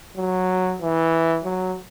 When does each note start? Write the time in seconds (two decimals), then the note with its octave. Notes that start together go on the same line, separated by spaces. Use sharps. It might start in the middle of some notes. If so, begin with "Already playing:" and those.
0.17 F#3
0.81 E3
1.44 F#3